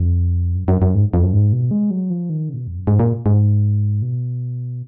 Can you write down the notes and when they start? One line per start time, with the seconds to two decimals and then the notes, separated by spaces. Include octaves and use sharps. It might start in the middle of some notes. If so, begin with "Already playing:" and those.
Already playing: F2
0.55 F#2
0.68 F#2
0.82 F#2
0.95 G#2
1.14 F2
1.23 F#2
1.33 G#2
1.53 B2
1.71 G#3
1.91 F#3
2.10 F3
2.30 D#3
2.49 C#3
2.54 A#2
2.58 B2
2.67 F2
2.77 F#2
2.87 G#2
3.00 A#2
3.26 G#2
4.02 B2